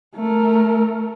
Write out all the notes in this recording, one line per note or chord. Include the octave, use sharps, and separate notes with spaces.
A3 A#4